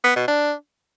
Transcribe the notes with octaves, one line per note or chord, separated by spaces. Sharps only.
B3
B2
D4